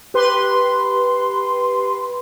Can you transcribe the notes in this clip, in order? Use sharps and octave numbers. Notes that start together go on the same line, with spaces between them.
G4 B4 C6